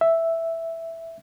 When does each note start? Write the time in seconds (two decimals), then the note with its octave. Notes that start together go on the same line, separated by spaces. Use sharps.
0.01 E5